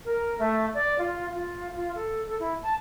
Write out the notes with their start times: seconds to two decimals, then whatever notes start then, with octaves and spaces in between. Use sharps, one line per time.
0.05 A#4
0.38 A3
0.74 D5
0.99 F4
1.34 F4
1.75 F4
1.95 A4
2.27 A4
2.39 E4
2.63 A5